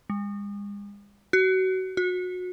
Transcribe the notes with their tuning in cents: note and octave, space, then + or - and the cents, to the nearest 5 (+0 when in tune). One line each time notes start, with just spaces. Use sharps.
G#3 -40
F#4 +25
F#4 -30